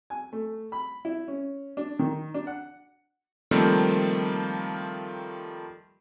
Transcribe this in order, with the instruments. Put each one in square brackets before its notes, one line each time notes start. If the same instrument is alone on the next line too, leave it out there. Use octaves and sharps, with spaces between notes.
[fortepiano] G#5
A3
B5
E4
C#4
D4
D#3
D4
F#5
[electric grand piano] D#3 F3 G3 A3 A#3 C4